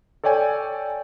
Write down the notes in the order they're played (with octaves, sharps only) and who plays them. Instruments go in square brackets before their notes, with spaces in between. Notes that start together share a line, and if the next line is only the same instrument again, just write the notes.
[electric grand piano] A4 C#5 D5 G5 G#5